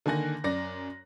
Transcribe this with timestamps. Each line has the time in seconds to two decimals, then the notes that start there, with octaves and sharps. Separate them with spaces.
0.06 D3 D#3 A#3 G#5 F#6 A#6
0.44 F#2 D5 A#6